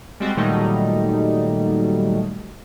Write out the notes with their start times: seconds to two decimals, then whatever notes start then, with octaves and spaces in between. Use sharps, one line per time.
0.20 G3 G#3 C4 F#4 C5
0.36 A#2 D#3 F#3 G3 A3 D#4